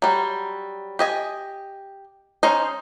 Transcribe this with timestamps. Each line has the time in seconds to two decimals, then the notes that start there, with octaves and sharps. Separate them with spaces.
0.02 F#3 G3
0.99 G4 D#5 G#5
2.43 C#4 D#4 C5 D#5